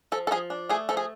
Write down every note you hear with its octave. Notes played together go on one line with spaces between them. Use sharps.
F3 A4
A4
F3 G#4
D4
A3 G#4
F3 A4
G#4